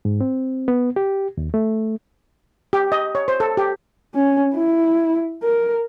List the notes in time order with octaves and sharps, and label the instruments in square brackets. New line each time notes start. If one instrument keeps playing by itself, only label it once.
[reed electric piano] G#2
C4
B3
G4
D#2
A3
[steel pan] G4
D#5
C#5
C5
A4
G4
[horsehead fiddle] C#4
E4
A#4